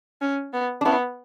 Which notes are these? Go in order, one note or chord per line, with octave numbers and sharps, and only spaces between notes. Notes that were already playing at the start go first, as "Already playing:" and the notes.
C#4
B3
D4
B3 C#4 E4